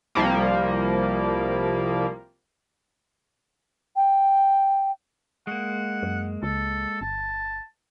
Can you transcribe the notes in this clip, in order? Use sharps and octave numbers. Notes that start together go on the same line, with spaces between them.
C2 F3 G3 A#3
G5
G#3 A#3 F#5
F#2
C#2 A4
G1 A5